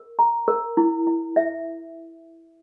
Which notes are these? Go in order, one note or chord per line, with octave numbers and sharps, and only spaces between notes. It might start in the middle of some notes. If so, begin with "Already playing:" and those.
Already playing: A#4
A#5
A#4
E4
E4
E5